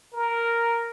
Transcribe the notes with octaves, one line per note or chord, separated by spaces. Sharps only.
A#4